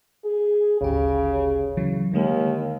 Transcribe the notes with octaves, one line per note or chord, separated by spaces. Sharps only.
G#4
G#1 D2 C#3 G4
C#3 E3 F#3
D#2 D3 G#3 A#3